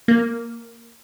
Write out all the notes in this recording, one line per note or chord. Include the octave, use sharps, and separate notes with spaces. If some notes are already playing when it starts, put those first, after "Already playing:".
A#3